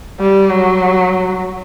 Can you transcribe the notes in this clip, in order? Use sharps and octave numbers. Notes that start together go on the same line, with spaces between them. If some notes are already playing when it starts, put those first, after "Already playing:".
G3
F#3